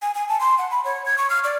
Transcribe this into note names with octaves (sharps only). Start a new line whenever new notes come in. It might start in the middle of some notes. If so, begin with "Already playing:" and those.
G#5
G#5
A5
C6
F#5
B5
C#5
G#6
C#6
F6
D5